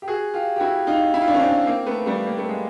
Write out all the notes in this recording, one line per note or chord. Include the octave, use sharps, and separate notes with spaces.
G4
F#4 G#4
F4 G4
G4
E4 F#4
D#4 F4
E4
F4
D4 E4
C#4
C4 D4
A#3 C4
A3 B3
G3 A3
A#3
A3
G#3